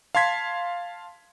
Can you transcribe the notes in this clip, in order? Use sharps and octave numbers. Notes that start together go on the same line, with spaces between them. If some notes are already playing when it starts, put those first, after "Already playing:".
F5 A5 C6 G#6 B6